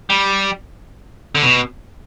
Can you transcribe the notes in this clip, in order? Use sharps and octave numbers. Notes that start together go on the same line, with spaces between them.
G3
D3
B2